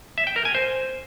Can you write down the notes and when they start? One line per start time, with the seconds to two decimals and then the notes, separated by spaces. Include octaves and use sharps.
0.18 E5
0.27 G5
0.36 A#4
0.45 G#5
0.55 C5